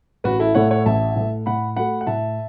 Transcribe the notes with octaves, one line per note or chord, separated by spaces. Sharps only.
A1 F#4 B4
E4 A4
A2 A3 C#5 F#5
C#5 F#5
A1 E5 A5
A2 A3
A2 F#5 B5
A3 F#4 A4 F#5 B5
F#5
A2 E5 A5